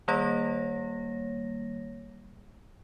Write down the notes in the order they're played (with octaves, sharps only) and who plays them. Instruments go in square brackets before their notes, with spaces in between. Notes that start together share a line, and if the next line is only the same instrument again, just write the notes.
[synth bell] D#3 G3 A#3 C#5 A#6